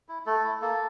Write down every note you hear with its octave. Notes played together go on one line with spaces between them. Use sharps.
E4
A3 A4
E4
A#3 A4